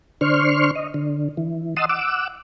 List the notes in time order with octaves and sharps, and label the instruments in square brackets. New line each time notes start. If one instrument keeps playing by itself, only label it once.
[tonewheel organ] D3 D4 C5 C6 C#6 F6
D#5
D3
E3
D#5 F#5 A5 C6 D#6 E6
F#5 D6 E6